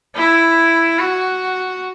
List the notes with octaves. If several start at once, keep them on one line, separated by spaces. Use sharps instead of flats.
E4
F#4